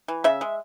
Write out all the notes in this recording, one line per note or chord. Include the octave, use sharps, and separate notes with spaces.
E3
C#3 E5
G#3